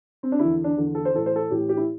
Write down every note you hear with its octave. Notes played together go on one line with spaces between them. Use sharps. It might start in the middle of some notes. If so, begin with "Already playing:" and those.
C4
D4
E2 D3 E4
D4
E2 D3
A4
C5
A2 E3 A4
C5
A4
A2 E3 G4
G4
E4